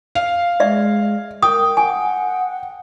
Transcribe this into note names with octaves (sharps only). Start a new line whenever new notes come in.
F5
G#3 D5 E5
A#4 G5 D#6
F#5 G#5